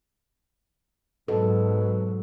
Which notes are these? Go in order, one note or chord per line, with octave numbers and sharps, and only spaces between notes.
G#2 B2 F#3 A4